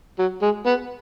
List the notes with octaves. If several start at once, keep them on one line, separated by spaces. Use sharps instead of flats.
F#3
G#3
B3